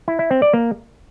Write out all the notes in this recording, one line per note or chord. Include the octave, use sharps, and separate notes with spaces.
E4
E4
C4
D5
A#3